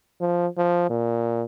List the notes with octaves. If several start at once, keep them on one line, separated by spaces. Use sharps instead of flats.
F3
F3
A#2